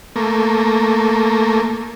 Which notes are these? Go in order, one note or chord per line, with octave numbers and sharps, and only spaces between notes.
A3 A#3